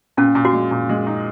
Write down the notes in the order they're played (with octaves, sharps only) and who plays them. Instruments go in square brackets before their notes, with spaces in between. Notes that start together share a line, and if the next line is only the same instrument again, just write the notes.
[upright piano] A#2 [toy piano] C#4
[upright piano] A#2
[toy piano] F#4
[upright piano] G#3
A#2
G#3
D#4